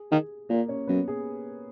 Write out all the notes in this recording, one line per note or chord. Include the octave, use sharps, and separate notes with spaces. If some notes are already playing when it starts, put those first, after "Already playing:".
Already playing: G#4
D#3 G#4
A#2 A#3 A#4
C#4 C#5
F#2 B3 B4
G#4